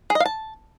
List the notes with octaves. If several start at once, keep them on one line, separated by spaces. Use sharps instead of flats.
G#4
D#5
F5
A5